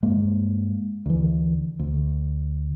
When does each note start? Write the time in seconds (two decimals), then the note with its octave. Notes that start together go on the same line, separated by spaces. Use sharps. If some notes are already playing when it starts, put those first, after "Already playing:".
0.03 G2 G#3 A#3
1.06 D2 E3
1.79 D2